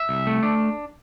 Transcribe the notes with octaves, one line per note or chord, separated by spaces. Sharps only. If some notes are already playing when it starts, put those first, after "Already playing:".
Already playing: E5
C2
A3
D4